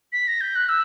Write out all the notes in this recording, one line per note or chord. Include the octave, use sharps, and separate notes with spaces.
B6
A#6
G6
F#6
E6